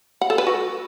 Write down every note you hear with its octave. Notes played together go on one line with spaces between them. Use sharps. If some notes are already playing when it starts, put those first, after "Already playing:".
F#5
A4
B4
F#4